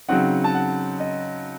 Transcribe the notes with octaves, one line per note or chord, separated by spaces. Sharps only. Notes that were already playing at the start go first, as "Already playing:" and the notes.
C#3 F#3 C4 D#4 F#5
A5
F#5
D#5